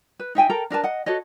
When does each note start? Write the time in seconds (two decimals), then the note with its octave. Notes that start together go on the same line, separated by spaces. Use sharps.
0.20 B4
0.35 D#4 E5 G5 G#5
0.50 A4 A#4 G5 A#5
0.70 D4 A#4 B4 A5
0.84 D#5 F#5
1.06 F#4 A4 C#5 D#5